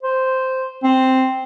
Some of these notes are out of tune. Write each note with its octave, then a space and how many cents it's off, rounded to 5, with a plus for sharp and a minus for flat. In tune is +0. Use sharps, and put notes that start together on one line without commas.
C5 -5
C4 +0